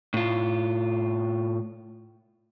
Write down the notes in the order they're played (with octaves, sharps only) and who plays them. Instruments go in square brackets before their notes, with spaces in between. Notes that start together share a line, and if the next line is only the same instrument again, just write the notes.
[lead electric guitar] A2 F4